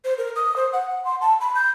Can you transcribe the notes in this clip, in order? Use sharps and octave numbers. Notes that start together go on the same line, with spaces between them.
C5
A#4
D#6
C5
F#5
F#5
C6
A5
B5
G6